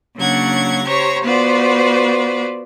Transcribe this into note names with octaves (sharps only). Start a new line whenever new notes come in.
C#3 F#3 A#3 D4 F#5 G#6
G4 C5 C#5 A#5 C#6
B3 F4 F#4 B4 C5 D5